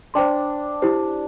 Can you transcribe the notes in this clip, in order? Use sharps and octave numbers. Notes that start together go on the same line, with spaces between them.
D4 C5 G5 C6
E4 G4 C5